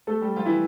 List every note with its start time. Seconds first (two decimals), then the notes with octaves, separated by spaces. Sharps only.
0.07 A3 A4
0.21 G3 G4
0.36 F3 F4
0.45 E3 E4